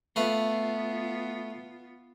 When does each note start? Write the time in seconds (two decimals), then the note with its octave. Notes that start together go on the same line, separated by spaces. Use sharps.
0.16 A3 B3 F4 B4 F5